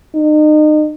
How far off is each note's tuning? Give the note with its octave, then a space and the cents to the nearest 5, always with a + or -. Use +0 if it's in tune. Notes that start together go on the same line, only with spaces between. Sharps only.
D#4 -35